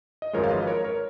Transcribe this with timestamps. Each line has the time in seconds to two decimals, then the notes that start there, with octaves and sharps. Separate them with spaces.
0.22 D#5
0.33 G#1 F#2 F3 G#3 A#4 C#5
0.44 F5
0.50 B4 D#5
0.62 B4
0.67 A#4 C#5
0.84 A#4 C#5